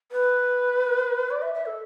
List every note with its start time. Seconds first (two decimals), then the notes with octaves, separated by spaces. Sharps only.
0.12 B4
1.30 D5
1.42 E5
1.54 E5
1.66 A4